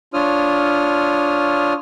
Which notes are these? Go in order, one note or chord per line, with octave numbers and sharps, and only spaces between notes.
D4 F4 C#5 D#6 F6